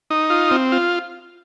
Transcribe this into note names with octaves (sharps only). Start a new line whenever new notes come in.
D#4
F4
C4
F4